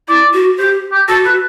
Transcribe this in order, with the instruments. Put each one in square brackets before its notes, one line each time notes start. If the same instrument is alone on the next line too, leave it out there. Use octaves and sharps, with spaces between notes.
[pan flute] E4 [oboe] D5
[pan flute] F#4
[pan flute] G4 [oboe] C5
[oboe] G4
[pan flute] F#4 [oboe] A4
[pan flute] F#4 [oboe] B4